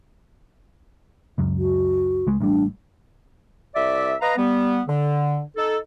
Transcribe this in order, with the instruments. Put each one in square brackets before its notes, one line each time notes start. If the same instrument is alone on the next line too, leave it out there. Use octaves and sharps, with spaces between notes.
[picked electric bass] C#2 F#2
[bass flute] F#4
[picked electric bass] C#2 G#3
[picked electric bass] A1 A2 G3 [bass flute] D4
[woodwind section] C2 D5 E5
B4 D#5 F5 A#5
G3 B3
D3
D#4 A4